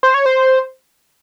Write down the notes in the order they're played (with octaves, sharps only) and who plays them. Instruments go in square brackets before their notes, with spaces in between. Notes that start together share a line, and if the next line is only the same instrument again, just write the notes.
[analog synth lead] C5
C#5
C5